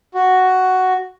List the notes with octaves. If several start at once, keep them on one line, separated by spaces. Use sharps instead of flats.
F#4